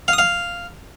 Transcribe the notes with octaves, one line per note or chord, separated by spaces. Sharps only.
F5
D#6
F5